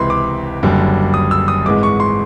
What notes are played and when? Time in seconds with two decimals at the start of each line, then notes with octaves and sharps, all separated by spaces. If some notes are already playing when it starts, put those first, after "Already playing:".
Already playing: C#2 C3 E3 B5 C6
0.10 D6
0.63 F#1 F#2 D3 G3
1.14 D#6
1.31 E6
1.48 D#6
1.65 G#1 G#2 E3 G#3 D6
1.83 C#6
2.00 C6